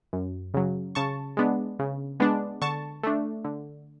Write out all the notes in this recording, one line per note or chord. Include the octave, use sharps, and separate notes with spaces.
F#2
C#3 F#3
C#3 A5 C#6
G#3 B3 D4
C#3
G#3 B3 D4
D3 A5 C#6
A3 D4
D3